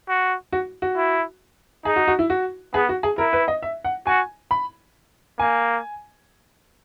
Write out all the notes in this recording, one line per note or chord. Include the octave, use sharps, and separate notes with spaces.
F#4
F#4
F#4
E4
D#4 G#4
F#4
F#4
E4
F#4
B3 G#4
F#4
G#4
E4 A#4
B4
D#5
E5
F#5
F#4 G#5
B5
A#3 G#5